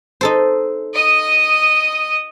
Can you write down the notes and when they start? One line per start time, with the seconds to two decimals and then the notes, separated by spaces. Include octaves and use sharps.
0.21 D#4 A4 C5
0.94 D#5 D#6